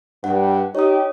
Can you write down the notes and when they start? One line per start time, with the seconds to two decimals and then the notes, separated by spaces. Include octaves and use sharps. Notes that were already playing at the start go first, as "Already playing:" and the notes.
0.24 G2 F#5
0.75 D#4 G4 C#5 D#6